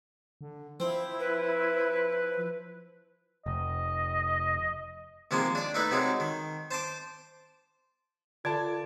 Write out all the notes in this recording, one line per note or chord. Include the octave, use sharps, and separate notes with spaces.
D3
F3 C4 E4 C5
B4
F1 D#5
D#2 C3 F3 G#3 A#3 C6
D4 D5
A3 D#4 E4 B4
C3 F#3 G#3 D#4
D#3
C5 A5 C6 D6
D3 F4 A4 D5 A5 G#6